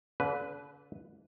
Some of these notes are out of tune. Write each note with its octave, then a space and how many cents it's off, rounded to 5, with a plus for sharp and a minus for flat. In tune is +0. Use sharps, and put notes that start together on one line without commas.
D3 -40 B4 +0